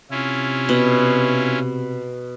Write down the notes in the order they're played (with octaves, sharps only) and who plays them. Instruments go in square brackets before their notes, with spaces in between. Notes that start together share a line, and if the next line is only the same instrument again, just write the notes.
[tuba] C3 [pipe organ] C#4 E4 F4
[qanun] B2